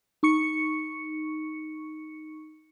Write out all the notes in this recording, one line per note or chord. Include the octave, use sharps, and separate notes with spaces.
D#4 C#6 C#7